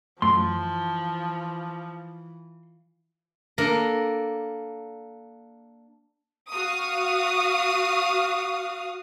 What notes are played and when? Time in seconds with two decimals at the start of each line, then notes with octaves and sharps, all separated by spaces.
0.22 F#2 E3 F3 A3 C6
3.58 A#3 D4 A4 A#4
6.51 F#4 F5 D#6